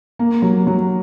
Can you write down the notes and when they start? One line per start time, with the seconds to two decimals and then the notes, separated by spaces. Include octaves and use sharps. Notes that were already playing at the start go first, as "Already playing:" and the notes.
0.19 A#3
0.42 F#3
0.67 F#3